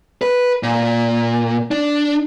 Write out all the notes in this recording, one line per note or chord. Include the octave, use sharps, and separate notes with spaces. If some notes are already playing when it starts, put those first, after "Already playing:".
B4
A#2
D4